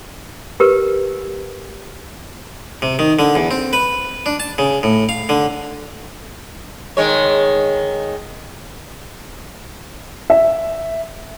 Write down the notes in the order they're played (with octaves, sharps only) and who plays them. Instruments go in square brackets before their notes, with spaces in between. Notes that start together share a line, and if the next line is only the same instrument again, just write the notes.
[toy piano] G4 A#4 B4
[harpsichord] C3
D#3
D3
E2
C4
B4
D4
A5
C#3
A2
F5
D3
[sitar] D#3 G#3 C#5
[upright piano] E5